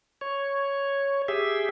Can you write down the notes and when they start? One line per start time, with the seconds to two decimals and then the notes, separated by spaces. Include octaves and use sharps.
0.21 C#5
1.28 G4 G#4 E5